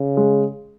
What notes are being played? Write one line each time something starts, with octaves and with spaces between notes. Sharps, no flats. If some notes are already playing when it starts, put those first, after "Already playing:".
Already playing: C#3
G#3